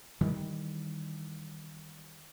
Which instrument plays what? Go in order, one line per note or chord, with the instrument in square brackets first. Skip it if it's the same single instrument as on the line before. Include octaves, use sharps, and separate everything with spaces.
[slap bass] D#3 E3 G3